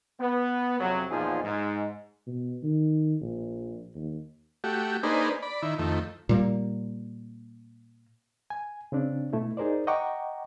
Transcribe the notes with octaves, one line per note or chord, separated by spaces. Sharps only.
B3
F2 C3 F#3
E2 A#2 F3 D#4 G#4
G#2
B2
D#3
A#1
D#2
A3 F#4 G4
A#3 D4 D#4 G#4 B4 C5
D5 B5
D#3 E4
F2 D#3 A3
A#2 G3 A#3
G#5
C#3 C4 D4
B2 A3 E4
D#4 G#4 A#4 C5 D5
D#5 F#5 G5 A#5 C#6 D6